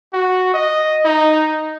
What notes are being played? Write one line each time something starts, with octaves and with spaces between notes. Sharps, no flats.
F#4
D#5
D#4